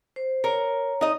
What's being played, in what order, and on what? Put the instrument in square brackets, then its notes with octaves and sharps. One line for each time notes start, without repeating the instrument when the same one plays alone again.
[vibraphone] C5
[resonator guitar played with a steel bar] A#4 [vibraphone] C#5 A#5
[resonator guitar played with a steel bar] D#4 D#5